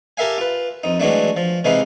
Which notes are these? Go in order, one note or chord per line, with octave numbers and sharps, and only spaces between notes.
G4 A4 A#4 E5 F5 G#5
F4 B4
F2 D#4
E3 F#3 G#3 A3 D4
F3
C3 E3 G#3 D#4 B4 F5